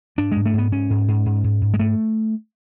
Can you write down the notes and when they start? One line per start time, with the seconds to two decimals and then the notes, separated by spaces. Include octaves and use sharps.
0.18 G#2 D4
0.32 G#2 G#3
0.46 A3
0.53 G#2 B3
0.72 G#2 C#4
0.90 G#2
1.08 G#2
1.26 G#2
1.44 G#2
1.61 G#2
1.74 G#3
1.80 G#2 A3